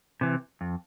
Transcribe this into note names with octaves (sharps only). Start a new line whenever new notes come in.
C3 E3
F2